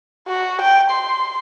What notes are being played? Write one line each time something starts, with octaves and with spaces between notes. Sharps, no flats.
F#4
G5
C6